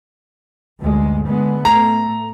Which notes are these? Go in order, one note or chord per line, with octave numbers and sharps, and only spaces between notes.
D2 G2 G#3
D3 G#3 B3
A2 A3 A#5